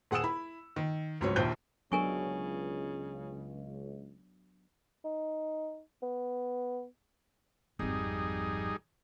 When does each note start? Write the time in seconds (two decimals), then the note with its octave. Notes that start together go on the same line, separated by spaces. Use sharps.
0.11 D#1 G#4 F#5 D#6 E6 E7
0.23 E4 B5
0.76 D#3
1.21 C#2 G#2 F3 F#3 C4 C#5
1.36 A#1 D#2 A#2 C5 G5 G6
1.92 C#2 C#3 F#3 B3 D4 A#4 G#5 C#6
5.05 D#4
6.02 B3
7.79 G#1 F2 G3 D#4 G#4